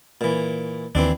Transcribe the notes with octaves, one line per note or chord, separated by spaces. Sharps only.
A#2 E3
D#2 E3 C4 D4